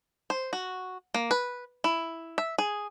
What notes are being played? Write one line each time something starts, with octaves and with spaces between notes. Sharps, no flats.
C5
F#4
A#3
B4
E4
E5
G#4